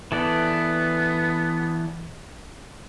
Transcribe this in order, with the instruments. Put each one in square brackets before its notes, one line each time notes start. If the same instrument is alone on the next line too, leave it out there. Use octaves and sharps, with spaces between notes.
[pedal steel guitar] E3 A4 D5 [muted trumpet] B3